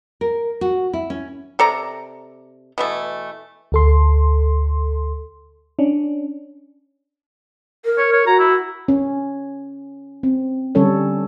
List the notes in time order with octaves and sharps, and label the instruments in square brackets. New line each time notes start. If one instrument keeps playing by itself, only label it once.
[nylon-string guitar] A#4
F#4
E4
C#4
[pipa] C3 A4 D5 A#5
B2 E3 A3
[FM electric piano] D2 A4 C6
C#4 D4
[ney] A#4
[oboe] C#5
C#5
[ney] F#4 [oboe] A#5
[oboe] E4
[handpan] C#4
C4
D3 G3 C#4 A4 C#5